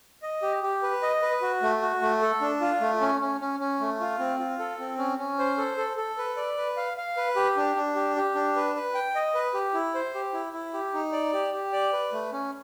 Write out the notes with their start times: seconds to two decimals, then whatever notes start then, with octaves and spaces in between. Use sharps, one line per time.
0.23 D#5
0.42 G4
0.63 G4
0.83 B4
1.03 D#5
1.22 B4
1.42 F#4
1.62 A3
1.82 F#4
2.02 A3
2.22 A4
2.41 D4
2.61 F4
2.81 A3
3.01 C#4
3.21 C#4
3.40 C#4
3.60 C#4
3.80 A3
4.00 F4
4.19 C4
4.39 F4
4.59 A4
4.79 C4
4.98 C#4
5.18 C#4
5.39 C5
5.58 A4
5.78 A4
5.97 A4
6.18 B4
6.37 D5
6.57 B4
6.77 F5
6.97 F5
7.17 B4
7.36 G4
7.57 D4
7.76 D4
7.95 G4
8.16 G4
8.35 D4
8.56 B4
8.75 B4
8.95 G5
9.15 D#5
9.35 B4
9.54 G4
9.74 E4
9.94 C5
10.15 G4
10.33 E4
10.53 E4
10.74 G4
10.94 D#4
11.12 D5
11.33 G4
11.53 G4
11.73 D5
11.93 B4
12.13 A3
12.32 C#4